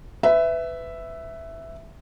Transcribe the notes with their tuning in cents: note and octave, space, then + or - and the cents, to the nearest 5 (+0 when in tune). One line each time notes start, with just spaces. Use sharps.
B4 +25 E5 +0